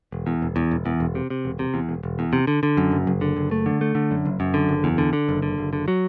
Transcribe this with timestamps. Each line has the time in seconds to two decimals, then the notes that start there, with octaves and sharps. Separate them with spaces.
0.12 E1
0.27 E2
0.42 E1
0.56 E2
0.71 E1
0.86 E2
1.00 E1
1.15 C3
1.30 C3
1.45 E1
1.59 C3
1.74 E2
1.89 E1
2.03 E1
2.19 E2
2.33 C3
2.47 D3
2.63 D3
2.77 F#2
2.92 F#1
3.07 F#1
3.21 D3
3.36 F#1
3.51 A3
3.66 D3
3.81 A3
3.95 D3
4.11 F#2
4.25 F#1
4.40 F#2
4.54 D3
4.69 F#1
4.84 E2
4.98 D3
5.13 D3
5.29 F#1
5.42 D3
5.58 F#1
5.73 D3
5.88 F#3